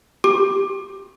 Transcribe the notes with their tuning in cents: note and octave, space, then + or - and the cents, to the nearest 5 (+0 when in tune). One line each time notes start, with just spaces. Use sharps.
G4 +0 D6 +15